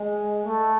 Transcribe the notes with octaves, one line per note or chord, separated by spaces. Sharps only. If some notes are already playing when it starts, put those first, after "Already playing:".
Already playing: G#3
A3